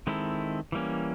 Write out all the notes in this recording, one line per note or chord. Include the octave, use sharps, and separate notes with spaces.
D#3 G#3 C4 E4 A4
E3 G3 A#3 C#4